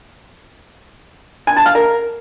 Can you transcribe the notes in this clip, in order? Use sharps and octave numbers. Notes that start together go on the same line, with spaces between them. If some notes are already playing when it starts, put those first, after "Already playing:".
G#5
A5
F5
A#4